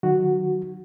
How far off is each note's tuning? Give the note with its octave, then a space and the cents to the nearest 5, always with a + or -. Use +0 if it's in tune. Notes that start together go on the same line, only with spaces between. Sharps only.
D#3 -25 F#3 +0 F#4 +0